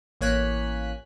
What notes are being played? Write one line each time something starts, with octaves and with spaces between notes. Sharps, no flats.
A1 A#3 C#5 G#5 F#6 B6